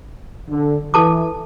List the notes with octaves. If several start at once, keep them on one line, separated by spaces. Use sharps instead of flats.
D3
E3 A4 A5 D6